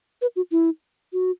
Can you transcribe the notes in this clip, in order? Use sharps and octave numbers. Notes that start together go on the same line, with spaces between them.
B4
F#4
E4
F#4